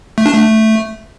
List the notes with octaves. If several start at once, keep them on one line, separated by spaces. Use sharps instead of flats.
A3
D4
A3